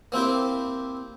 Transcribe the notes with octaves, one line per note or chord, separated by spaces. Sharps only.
A#3 C4 E4 G4